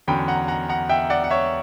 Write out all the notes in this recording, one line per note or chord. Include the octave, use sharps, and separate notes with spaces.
E2 D3 F#3 C#4 G5 B5
F#5 A#5
F#5 A#5
F#5 A#5
E5 G5
D5 F#5
F#5
C#5 E5